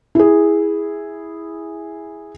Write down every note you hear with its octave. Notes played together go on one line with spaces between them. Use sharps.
E4 G#4